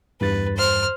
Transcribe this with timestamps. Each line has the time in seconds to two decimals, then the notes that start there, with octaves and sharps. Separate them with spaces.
0.21 E2 G2 B4 A6
0.57 C5 F6